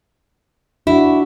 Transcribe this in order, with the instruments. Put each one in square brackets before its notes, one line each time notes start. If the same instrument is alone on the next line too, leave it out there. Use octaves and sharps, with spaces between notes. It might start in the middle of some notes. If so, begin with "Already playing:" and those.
[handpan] D4 F#4 [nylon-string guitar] E4